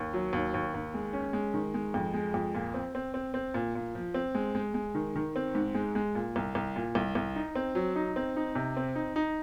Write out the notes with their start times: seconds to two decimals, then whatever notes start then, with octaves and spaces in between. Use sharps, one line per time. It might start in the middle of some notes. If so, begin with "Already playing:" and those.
Already playing: D#2
0.13 F#3
0.33 D#2
0.54 D#2
0.74 D#2
0.94 G#3
1.13 C#4
1.33 G#3
1.54 D#3
1.74 G#3
1.94 F2
2.14 G#3
2.34 F2
2.54 A#2
2.74 C4
2.95 C4
3.14 C4
3.34 C4
3.54 A#2
3.75 A#2
3.95 F3
4.14 C4
4.35 G#3
4.55 G#3
4.74 G#3
4.95 D#3
5.16 D#3
5.36 C4
5.55 G#2
5.75 G#3
5.95 G#3
6.15 A#2
6.36 C2
6.55 C2
6.76 A#2
6.95 C2
7.15 C2
7.36 D#4
7.55 C4
7.75 F#3
7.96 D#4
8.16 C4
8.36 D#4
8.55 C3
8.77 C4
8.95 D#4
9.16 D#4